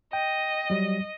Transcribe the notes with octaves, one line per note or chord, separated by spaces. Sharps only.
D#5 G5
F#3 G3